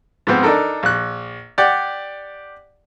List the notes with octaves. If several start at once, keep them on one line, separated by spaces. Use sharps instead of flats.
G#2 F3 B3 C4
D4 D#4 A4 A#4
A#1 F#6
G4 D5 F#5